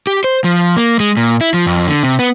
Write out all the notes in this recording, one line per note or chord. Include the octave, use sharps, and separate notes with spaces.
G4
C5
F3
A#3
G#3
A#2
E4
F3
F2
D3
C3
B3